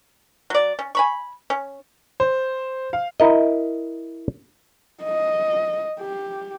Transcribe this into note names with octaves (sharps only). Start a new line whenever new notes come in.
F#3 D5
C#4
G#5 B5 C#6
C#4
C5
F5
E4 A#4 D#5
D#5
G4